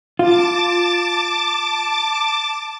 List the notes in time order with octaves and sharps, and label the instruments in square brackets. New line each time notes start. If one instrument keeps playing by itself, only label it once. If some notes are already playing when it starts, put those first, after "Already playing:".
[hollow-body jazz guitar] F4 [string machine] A5 D6 A6